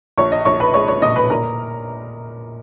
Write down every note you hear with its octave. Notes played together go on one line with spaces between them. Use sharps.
A#1 C#5 C#6
D#5
A#1 C#5 C#6
B4 B5
G#3 C#5 C#6
C#5 C#6
A#2 D#5 D#6
B4 B5
A#2 A#4 A#5